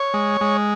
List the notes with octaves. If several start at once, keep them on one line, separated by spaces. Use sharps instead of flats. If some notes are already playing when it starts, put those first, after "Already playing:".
Already playing: C#5
G#3
G#3